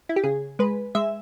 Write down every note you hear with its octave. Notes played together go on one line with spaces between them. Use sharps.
E4
G4
C#3 G#4
G#3 B4
G#3 E5